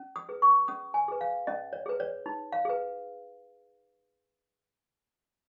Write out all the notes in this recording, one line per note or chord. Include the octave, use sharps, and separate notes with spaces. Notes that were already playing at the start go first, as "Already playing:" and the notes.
Already playing: C#4
D#6
G#4 B4
C#6
C#4 D#6
G#5
G#4 B4
F5
C#4 D#5
C#5
G#4 B4
C#5
D#4
F5
G#4 B4